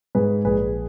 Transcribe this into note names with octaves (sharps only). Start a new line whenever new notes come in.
G#2 G#4 B4
A#1 G#4 B4